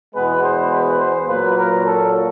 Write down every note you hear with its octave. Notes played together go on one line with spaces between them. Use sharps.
E2 B2 G#3 B3 B4
C5
B4
C5
A#2 F#3 A#3 B4
A#4
A4